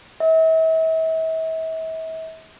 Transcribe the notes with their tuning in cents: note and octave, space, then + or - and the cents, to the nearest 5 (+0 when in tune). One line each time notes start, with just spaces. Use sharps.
E5 -40